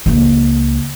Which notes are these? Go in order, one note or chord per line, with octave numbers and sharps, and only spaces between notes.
C#2 A#3